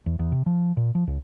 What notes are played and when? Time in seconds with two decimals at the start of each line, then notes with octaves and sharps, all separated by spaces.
0.06 E2
0.19 E2
0.32 C3
0.46 F3
0.77 A#2
0.95 F3
1.07 C#2